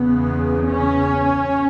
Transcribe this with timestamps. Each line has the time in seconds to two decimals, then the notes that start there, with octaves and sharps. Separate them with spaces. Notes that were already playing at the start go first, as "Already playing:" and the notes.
Already playing: E2 C#3 B3
0.68 C#4